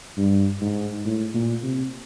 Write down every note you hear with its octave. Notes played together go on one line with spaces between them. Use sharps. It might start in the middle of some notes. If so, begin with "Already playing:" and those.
G2
G#2
A2
A#2
C3